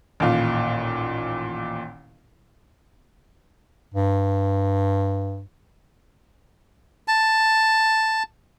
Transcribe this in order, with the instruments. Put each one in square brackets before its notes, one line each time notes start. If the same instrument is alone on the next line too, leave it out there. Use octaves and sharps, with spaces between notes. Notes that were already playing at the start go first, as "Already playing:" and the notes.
[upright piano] A1 D#2 A#2 F5
[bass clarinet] G2
[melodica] A5